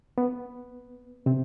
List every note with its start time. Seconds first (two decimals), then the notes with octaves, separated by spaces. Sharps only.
0.18 B3
1.26 C3 C4